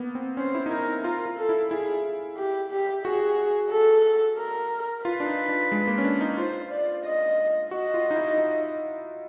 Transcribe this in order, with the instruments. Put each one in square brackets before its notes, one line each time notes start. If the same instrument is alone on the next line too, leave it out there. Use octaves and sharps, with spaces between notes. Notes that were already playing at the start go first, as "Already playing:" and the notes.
Already playing: [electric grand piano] A#3 B3
C4
[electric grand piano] C#4 [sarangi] C5
[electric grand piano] E4
D#4
[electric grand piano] E4 [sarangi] A#4
[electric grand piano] F4 [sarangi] A#4
[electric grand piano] F4
[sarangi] A4
[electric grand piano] E4
[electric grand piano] E4 [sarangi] G#4
[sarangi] G4
G4
[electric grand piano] F#4 [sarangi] G#4
[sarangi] A4
A#4
[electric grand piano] F4 [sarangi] B4
[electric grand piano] D4
D#4
D4
G#3
A#3
C#4
D4
D#4
[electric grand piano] F4 [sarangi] C5
[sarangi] D5
D#5
[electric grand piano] F#4 [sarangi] D#5
[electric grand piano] F4
D#4
E4
D#4